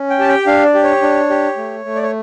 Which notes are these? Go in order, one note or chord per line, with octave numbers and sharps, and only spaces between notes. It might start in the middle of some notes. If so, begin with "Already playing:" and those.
Already playing: C#4
G5
G4 A5
G5
D4 F5
D5
G4
C#5
D4
G4
A3
A3
D5
C#5